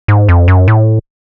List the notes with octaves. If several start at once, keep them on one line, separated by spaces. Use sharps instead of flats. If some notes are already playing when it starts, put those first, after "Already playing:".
G#2
F2
F#2
A2